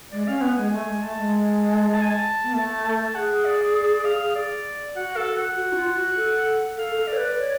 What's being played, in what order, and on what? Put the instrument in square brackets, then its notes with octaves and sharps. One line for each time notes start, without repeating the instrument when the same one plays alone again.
[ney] G#3 [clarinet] D5
[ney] C#4 [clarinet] F5
[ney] B3 [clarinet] F#5
[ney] G#3 [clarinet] G#5
[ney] A3 [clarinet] G#5
[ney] G#3
[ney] A3 [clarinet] A5
[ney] G#3
[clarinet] A5
A5
G#5
A5
[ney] B3
[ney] A3 [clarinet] A5
[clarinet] A5
[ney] G#4 [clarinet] F#5
[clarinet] D5
D5
F5
D5
[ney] F#4 [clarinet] F#5
[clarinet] A4
F#5
[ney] F#4
D4
F4
F#4
A4
[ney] A4 [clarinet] F5
[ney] A4
[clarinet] D5
[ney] C#5
B4
C#5